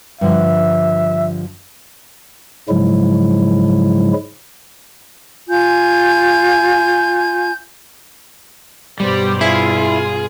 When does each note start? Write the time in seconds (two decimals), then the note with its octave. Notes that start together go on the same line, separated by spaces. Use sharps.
0.21 G2 D3 F3 E5
2.69 G#2 C#3 F3 F#3 G#3 E4
5.48 F4 G#5 G6
9.00 G2 B2 G3 G4 C5 D5
9.41 E4 F4 G#4